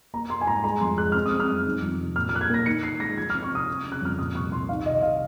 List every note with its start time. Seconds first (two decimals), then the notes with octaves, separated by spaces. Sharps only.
0.14 A#3 A#5
0.30 A#3 C6
0.41 G#5
0.47 G#2 A#5
0.64 G#3 A#5
0.81 F2 C6
0.98 G#3 F#6
1.12 C4 F6
1.26 D#6
1.32 C4
1.40 F6
1.48 F#2
1.65 D#3
1.82 F2
1.99 C3
2.16 A#2 F6
2.29 F6
2.33 A#3 F#6
2.41 G#6
2.50 A#3 A#6
2.66 D#3 C#7
2.83 D#3 C7
3.00 G#3 A#6
3.17 F3 G#6
3.30 F6
3.35 C4
3.43 C#6
3.51 C3 D#6
3.68 C4
3.85 C#3
3.92 F#6
4.02 F2 F6
4.18 A#2 D#6
4.35 C2 C#6
4.52 C2 C6
4.69 D#3 F5
4.86 C3 D#5
5.03 C3 F5